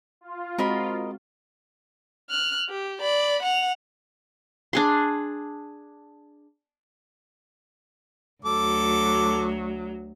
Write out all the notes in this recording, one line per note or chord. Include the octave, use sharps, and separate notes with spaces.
F4
G#3 C4 F#4 A#4 D#5 B5
F6 F#6
G4
D5 B5
F#5 F7
D4 G#4 C6
D2 F#3 A4 D6